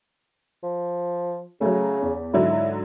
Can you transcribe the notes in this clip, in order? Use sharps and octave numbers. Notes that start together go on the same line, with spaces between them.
F3
C#3 F#3 A3
E2
G#2 D3 F#3 E4